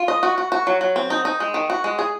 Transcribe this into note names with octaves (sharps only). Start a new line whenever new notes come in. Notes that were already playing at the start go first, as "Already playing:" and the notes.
Already playing: F4
D#5
F#4
F#4
F#4
F#3
F#3
C4
D#4
D#4
G#3
D#3
F#4
G#3
G#4